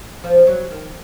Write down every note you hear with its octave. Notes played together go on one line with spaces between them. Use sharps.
F3
F#3
D#3